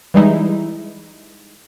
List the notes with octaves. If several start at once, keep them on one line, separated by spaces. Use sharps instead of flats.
E3 G3 G#3 D#4 E4